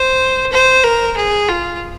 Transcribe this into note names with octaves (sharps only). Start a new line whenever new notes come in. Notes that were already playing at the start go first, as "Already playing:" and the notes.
Already playing: C5
C5
A#4
G#4
F4